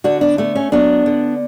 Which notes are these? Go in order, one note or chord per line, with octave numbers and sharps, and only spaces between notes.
D3 D4 F#4
B3 D4
A3 B3
C#4
F#3 B3 D4
D3